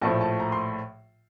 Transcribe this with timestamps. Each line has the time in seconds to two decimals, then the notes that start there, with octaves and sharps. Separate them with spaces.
0.01 A#1 A2 F3 A3 A5
0.21 A5
0.40 A#5
0.52 C6